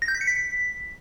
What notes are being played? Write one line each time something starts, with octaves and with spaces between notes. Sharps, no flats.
A#6
G6
B6
C#7
B6